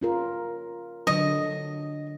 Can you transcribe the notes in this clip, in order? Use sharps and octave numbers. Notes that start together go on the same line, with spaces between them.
C#4 F4 A#4
D3 F#3 D#5